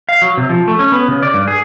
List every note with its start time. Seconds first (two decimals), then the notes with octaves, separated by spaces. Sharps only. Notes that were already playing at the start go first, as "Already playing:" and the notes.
0.09 F5
0.22 F#3
0.37 C3
0.49 F3
0.68 A3
0.79 C#4
0.92 B3
1.08 C#3
1.22 D5
1.34 G2
1.47 G#4